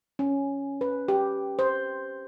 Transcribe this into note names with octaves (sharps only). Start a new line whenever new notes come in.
C#4
B4
G4
C5